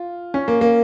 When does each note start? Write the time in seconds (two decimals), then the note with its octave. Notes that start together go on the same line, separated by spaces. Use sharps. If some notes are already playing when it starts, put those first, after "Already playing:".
Already playing: F4
0.34 C#4
0.48 A#3
0.61 A#3